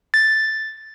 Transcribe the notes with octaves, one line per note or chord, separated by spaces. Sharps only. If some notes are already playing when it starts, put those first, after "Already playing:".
A6